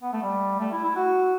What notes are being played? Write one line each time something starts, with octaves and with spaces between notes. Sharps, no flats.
B3
A3
G3
A3
E4
E4
F#4